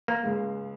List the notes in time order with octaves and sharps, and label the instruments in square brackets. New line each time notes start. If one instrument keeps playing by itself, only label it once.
[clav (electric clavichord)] A#3
[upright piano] C#2 C#3 G#3